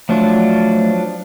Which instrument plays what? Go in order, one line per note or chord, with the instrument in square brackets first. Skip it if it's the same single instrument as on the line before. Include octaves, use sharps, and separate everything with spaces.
[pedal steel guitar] F3 F#3 D4 [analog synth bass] A3